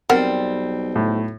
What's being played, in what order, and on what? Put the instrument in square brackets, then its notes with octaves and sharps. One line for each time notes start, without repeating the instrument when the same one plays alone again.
[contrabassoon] B1 [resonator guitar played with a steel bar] G3 C4 [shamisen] A#4 F#5
[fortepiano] A2